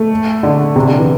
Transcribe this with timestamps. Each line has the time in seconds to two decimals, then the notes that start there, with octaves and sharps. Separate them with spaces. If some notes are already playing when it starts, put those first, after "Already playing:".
Already playing: A3
0.43 D3
0.76 C3
0.87 D3
0.98 E3